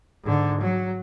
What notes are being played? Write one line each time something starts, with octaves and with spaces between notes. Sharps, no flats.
G#2 D3
F#3